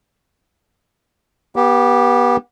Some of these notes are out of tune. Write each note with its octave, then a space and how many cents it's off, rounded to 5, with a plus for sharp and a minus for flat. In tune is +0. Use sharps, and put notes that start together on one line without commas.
B3 -30 G4 +0